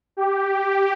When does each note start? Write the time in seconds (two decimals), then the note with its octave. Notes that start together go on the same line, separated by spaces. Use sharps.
0.17 G4